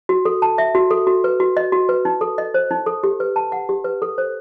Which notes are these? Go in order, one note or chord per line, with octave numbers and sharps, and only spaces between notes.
F#4
A4
A5
E5
F#4
A4
F#4
B4
F#4
D#5
F#4
B4
D#4
A4
D#5
C5
D#4
A4
G4
B4
A5
F#5
G4
B4
A4
C5